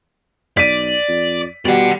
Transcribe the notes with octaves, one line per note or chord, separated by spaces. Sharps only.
B1 D5 B6 D#7
F2
B2 G3 D5 F#5